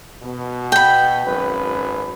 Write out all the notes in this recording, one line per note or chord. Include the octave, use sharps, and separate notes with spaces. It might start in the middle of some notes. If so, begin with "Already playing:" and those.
B2
G5 B5
G#1 F#2 B4